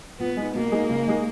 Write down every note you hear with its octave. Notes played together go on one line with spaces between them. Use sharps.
A#2 B3
G#3 D#4
B2 A#3
G#3 D#4 G#4
C#3
G#3 D#4 G#4